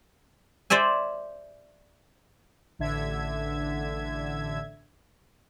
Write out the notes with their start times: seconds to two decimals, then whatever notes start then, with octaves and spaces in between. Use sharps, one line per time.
0.70 C5 D5 E5 G#5
2.79 A1 D3 E5 G#6